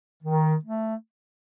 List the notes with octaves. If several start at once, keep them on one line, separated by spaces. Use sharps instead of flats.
D#3
A3